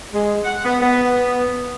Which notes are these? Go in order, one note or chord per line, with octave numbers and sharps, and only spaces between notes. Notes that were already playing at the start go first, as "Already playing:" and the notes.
G#3
F#5
B3
B3